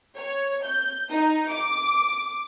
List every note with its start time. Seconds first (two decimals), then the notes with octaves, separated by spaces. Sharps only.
0.18 C#5
0.64 G6
1.10 D#4
1.51 D6